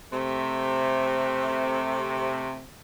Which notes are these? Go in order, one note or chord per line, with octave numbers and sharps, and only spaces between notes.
C3 A3